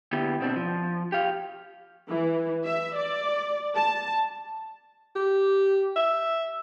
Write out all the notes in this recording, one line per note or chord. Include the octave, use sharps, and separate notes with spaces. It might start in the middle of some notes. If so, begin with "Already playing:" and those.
D3 B3 E4 G4
B2 C4 D4
F3
G4 F5
E3
E5
D5
A5
G4
E5